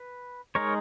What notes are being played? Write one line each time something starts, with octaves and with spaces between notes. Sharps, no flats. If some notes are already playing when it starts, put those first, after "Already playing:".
Already playing: B4
G#3 D#4 A#4 C#5